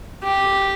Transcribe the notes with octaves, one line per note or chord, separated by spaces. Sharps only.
G4